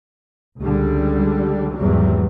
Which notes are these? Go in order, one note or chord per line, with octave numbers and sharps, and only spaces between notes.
C#2 D3 G3
G#1 E2 G#2 F#3 G3